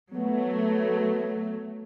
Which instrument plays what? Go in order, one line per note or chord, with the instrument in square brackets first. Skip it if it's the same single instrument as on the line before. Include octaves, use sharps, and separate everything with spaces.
[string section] F#3 A3 [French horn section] B3